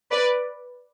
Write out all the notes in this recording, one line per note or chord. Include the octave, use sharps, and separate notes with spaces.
B4 D5